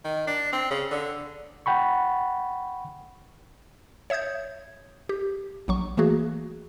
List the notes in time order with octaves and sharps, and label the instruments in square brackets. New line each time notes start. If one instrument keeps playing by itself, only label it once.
[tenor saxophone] D#3
D4
C4
C#3
D3
[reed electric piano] F#5 G5 B5 C#6
[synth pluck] C#5 E5 D#6 G6 G#6
G4
A#1 F#3 C#6
E3 A3 A#3 F#4 G#4